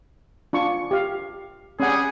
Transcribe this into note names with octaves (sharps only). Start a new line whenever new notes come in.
D4 F4 C#6
G4 F5
G3 C#4 G#4 F#5